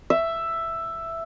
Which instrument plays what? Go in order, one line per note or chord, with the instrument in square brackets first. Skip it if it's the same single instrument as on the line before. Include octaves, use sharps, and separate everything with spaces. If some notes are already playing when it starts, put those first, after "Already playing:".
[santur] E5